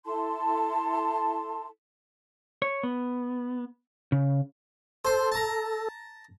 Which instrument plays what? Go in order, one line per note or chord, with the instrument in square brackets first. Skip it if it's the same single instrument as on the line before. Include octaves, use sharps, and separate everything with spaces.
[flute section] E4 A4 A5 C6
[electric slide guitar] C#5
B3
C#3
[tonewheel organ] A4 [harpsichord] C5 C6
[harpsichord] A5 A#5